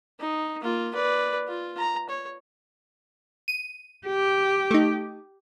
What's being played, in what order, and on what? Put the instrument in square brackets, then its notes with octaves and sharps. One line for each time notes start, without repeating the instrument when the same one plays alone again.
[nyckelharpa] D#4
A#3 F4
B4 D5
F4
A#5
C#5
[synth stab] D#7
[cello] G4
[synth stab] A3 D#4